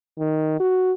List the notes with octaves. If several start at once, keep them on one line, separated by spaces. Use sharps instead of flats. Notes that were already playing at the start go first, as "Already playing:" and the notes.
D#3
F#4